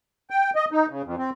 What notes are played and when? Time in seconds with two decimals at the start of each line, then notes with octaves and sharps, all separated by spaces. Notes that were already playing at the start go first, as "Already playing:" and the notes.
0.30 G5
0.56 D#5
0.71 D#4
0.89 C#3
1.04 F2
1.18 C4